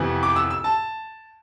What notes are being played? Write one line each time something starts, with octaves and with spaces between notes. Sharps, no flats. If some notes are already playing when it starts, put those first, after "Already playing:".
Already playing: F2 C3 E3 B3
D6
E6
E6
A5